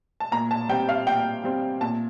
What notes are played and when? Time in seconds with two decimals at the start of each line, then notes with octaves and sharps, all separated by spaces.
0.20 A5
0.32 A#2 A#5
0.51 A5
0.69 G3 C4 G5
0.89 F5
1.07 A#2 G5
1.44 G3 C4
1.81 A#2 A5